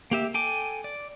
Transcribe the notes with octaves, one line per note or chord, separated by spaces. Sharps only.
A#3 G4 E5
A4 G5 G#5 D6
D5